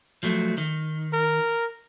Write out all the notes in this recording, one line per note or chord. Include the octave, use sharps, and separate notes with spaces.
F3 F#3 A3
D#3
A#4